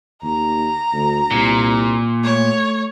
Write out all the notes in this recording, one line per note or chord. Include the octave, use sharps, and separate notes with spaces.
D#2 A#5
D2
C2 A#2
A3 C#5